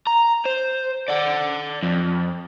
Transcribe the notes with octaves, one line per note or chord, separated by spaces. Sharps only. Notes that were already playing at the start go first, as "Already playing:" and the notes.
A#5
C5
D5 F#5
F2